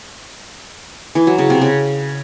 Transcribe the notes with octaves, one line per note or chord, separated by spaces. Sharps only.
E3
F#3
C#3
C3
C#3